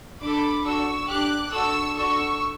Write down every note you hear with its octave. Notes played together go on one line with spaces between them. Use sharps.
D4 A4 B5 D6
D4 F#4 A4 C#6 E6
D4 G4 D6 F#6
D4 F#4 A4 C#6 E6
D4 F#4 A4 C#6 E6